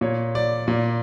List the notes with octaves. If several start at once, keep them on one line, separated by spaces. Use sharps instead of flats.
A#2 C#5
D5
A#2